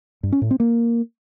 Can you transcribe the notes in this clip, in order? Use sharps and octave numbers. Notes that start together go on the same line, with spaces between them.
G2
C#4
A2
C4
A#3